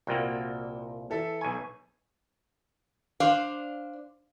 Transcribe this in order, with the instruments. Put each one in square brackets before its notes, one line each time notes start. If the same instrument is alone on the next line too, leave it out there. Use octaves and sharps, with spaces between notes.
[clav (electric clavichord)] C2 A#2 A#3 [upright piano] F#4 G5
[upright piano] E3 A4 E5
[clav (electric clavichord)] B1 G#5 [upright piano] C#6
[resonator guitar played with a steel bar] D4 C5 F5